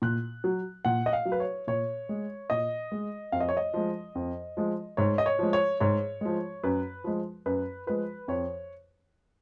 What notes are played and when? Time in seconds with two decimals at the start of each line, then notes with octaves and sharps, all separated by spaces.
0.02 A#2 F#6
0.44 F#3
0.85 A#2 F#5
1.06 D#5
1.13 F5
1.25 F#3
1.32 B4
1.40 C#5
1.67 A#2 C#5
2.09 G#3
2.50 A#2 D#5
2.92 G#3
3.32 F2 F5
3.40 D#5
3.49 C#5
3.57 D#5
3.74 F3 G#3
4.15 F2
4.57 F3 G#3
4.97 G#2 C#5
5.18 D#5
5.26 C#5
5.39 F3 G#3
5.53 C#5
5.80 G#2 C#5
6.21 F3 G#3
6.64 F#2 B4
7.04 F3 G#3
7.46 F#2 B4
7.87 F3 G#3 B4
8.28 F2 C#5